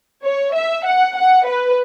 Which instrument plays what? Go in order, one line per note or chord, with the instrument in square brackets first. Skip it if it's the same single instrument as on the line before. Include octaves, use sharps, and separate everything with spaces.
[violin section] C#5
E5
F#5
F#5
B4